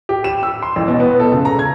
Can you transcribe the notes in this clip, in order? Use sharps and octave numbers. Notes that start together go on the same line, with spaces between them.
G4
E7
E6
C6
A1
B2
B3
A4
C#3
A#5
G#6